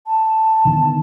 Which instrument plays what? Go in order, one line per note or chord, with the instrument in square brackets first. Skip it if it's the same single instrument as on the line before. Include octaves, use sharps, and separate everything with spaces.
[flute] A5
[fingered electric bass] D3 D#3 B3